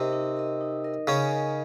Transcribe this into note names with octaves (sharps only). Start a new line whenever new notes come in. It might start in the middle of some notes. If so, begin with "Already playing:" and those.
Already playing: C3 C4 D#4 A#4 D#5
D#4
A#4 D#5
D#4
A#4 D#5
C#3 C#4 D#4
A#4 D#5